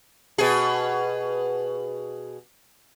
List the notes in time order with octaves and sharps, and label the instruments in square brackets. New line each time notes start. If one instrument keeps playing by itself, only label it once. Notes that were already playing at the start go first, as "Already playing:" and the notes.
[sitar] B2 G#4